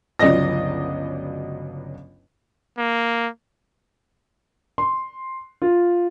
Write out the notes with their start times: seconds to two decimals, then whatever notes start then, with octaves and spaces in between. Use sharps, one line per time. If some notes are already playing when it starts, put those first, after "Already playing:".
0.19 G1 C#2 F#3 D5 D#5 A#6
2.78 A#3
4.78 C6
5.62 F4